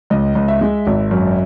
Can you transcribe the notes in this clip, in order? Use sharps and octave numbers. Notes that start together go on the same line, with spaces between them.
C#2 D#5
C#2
E5
G#3
G#1
F#2